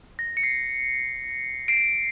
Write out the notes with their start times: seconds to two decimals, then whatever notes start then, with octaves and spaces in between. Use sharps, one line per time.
0.19 A#6
0.37 C#7
0.43 C7
1.68 C7 D7